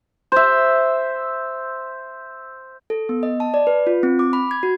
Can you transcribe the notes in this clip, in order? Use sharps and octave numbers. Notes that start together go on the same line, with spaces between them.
C5 E5
A4
B3
D#5
A5
D5
B4
F4
C4
D6
B5
G#6
F#4